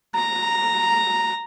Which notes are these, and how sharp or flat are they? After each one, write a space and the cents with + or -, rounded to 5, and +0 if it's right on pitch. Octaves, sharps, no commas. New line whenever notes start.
A#5 -5